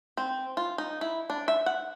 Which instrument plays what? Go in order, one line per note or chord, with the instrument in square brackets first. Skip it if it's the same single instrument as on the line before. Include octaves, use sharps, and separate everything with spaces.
[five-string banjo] C4
F4
D#4
E4
D4
E5
F#5